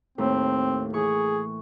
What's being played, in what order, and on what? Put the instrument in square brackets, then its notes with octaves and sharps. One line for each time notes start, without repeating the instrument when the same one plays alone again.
[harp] D#2 A2 [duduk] C4
[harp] E3 C#6 [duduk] G#4